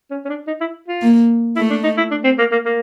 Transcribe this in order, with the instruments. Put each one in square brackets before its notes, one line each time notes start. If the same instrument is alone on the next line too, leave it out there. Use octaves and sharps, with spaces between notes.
[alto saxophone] C#4
C#4
D4
D#4
E4
F4
[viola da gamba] A#3
[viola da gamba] A3 [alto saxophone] E4
[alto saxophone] D4
D#4
E4
D4
C4
A#3
A#3
A#3